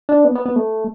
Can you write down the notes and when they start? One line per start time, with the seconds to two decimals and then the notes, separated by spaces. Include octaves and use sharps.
0.09 D4
0.25 B3
0.35 B3
0.46 B3
0.56 A3